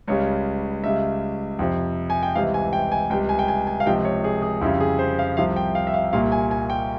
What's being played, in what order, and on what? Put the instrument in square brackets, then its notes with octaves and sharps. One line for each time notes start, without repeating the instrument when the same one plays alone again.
[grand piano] C#2 C#3 G3 C#5
C#2 C#3 G3 E5
F2 C3 F3
G#5
G5
C#2 C3 E3 G3 F5
G#5
G5
G#5
C#2 C3 G3 G5
G#5
G5
G#5
G#5
F5
C#2 C3 F3 G5
C#5
G#4
G#4
F2 C#3 G3 E4
G#4
C5
F5
C2 C3 F3 F5
G5
F5
E5
F5
C2 A#2 G3 F5
G#5
G#5
G5